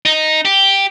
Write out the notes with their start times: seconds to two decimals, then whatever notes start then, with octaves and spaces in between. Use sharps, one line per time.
0.05 D#4
0.45 G4